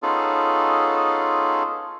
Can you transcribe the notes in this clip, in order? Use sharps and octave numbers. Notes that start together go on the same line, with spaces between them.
B3 C#4 D#4 F4 G#4 A4